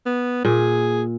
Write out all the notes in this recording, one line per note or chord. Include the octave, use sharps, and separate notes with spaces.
B3
A#2 G#4